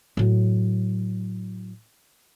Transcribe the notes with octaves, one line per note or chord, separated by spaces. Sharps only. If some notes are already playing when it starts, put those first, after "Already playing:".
A2 F#3